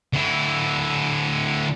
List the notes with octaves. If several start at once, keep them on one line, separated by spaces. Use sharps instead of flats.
D3 E4